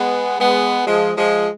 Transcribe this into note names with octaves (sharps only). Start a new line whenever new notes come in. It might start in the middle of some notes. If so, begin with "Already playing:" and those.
Already playing: G#3 B3
G#3 B3
F3 G#3
F3 G#3